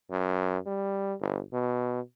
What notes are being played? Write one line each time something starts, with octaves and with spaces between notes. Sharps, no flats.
F#2
G3
G1
B2